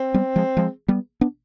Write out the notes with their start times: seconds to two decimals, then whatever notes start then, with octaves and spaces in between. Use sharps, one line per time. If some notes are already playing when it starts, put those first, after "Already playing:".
Already playing: C4
0.14 G3 B3
0.36 F3 G#3
0.57 F3 G#3
0.88 G3 B3
1.21 B3 D4